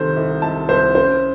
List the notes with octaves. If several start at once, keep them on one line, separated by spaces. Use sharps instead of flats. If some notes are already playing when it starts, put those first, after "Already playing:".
Already playing: C2 C3 D#3 A4 C5
C2
C2 A5
C2 C5
C#4 C5